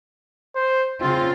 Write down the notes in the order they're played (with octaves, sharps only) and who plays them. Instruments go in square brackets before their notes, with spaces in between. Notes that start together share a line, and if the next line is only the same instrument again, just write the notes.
[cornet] C5
[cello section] C#3 F4 [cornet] C4